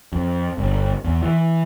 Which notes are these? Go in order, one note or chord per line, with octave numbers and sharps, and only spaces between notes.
F2
G1
E2
E3